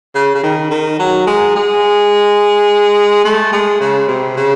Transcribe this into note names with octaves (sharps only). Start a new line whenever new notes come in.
C#3
C#3
D#3
D#3
F#3
G#3
G#3
A3
G#3
C#3
C3
C#3